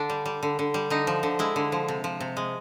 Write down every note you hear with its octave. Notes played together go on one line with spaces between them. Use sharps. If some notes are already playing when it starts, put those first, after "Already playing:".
Already playing: D3 D4
G3
G3
D3
D3
G3
D3 D#4
F3
D3
G#3 E4
D3
F3
C3
F3
C3
G#3